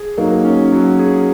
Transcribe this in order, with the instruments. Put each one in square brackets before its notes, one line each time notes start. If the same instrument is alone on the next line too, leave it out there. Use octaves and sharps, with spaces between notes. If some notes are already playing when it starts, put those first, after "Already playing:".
Already playing: [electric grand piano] G#4
[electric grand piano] F#3 [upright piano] A#3 D#4
[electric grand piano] C#4
F#3
G#4